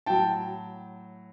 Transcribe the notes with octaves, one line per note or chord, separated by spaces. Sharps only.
A2 F#3 G5 A5